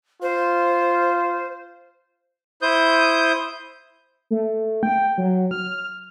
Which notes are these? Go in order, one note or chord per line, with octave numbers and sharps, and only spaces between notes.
F4 C5
E4 C5 D#6 G6
A3
G5
F#3
F6